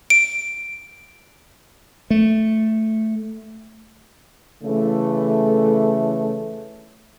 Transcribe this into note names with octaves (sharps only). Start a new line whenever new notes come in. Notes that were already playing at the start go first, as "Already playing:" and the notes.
D7
A3
C#3 E3 A3